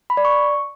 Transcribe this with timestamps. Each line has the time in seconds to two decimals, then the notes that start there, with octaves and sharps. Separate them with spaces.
0.10 B5
0.17 D5
0.25 C#6